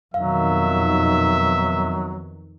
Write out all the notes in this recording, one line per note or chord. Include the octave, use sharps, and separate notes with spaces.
F2 B2 D#3 F#3 E5 F5